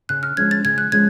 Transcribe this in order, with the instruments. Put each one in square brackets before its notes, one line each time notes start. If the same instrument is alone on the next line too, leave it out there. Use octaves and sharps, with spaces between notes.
[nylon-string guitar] C#3 [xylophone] F#6
[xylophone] F6
[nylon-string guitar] F3 G#3 C#4 [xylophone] G#6
[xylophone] A6
[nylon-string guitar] C#3 [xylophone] G#6
[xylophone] F#6
[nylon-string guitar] F3 G#3 C#4 [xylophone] G#6